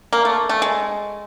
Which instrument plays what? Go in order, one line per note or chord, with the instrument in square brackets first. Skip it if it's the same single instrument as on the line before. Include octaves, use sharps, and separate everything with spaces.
[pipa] A#3
A3
A3
G#3